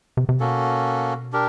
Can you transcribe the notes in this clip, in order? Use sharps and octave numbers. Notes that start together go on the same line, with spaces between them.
C3
C3
B2 A#3 C#4 F#4 A4
D4 G4 A#4